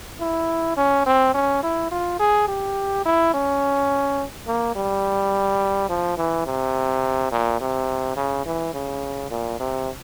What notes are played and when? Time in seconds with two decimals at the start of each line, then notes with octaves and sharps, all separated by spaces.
0.21 E4
0.77 C#4
1.06 C4
1.34 C#4
1.63 E4
1.91 F4
2.20 G#4
2.48 G4
3.05 E4
3.34 C#4
4.47 A#3
4.76 G3
5.89 F3
6.18 E3
6.47 C3
7.32 A#2
7.61 C3
8.17 C#3
8.46 E3
8.74 C#3
9.31 A#2
9.60 C3